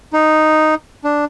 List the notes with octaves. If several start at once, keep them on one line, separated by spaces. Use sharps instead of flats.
D#4
D4